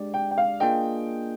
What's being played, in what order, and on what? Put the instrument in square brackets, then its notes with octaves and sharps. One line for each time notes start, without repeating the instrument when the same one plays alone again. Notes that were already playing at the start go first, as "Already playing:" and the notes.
Already playing: [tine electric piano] G#3 D4 G4 D5
[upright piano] G5
G5
F5
[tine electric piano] A#3 D4 F4 G#4 D#5 [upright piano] G5